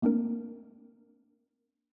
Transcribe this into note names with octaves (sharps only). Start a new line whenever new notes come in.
A3 A#3 C4 D4 A#4